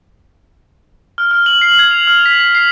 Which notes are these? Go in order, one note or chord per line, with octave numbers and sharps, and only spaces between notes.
F6
F6
F#7
C7
G#6
F7
F6
B6
B6
C7